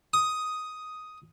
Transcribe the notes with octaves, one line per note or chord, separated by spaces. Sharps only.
D#6